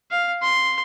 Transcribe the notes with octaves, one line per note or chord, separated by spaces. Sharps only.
F5
C6